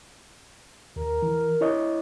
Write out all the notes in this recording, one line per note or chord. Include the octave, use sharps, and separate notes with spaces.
D#2 A#4
E3
E4 C#5 D#5